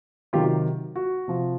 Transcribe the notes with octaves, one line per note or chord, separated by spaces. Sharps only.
C3 D#3 F#3 F4 G4
F#4
C3 F3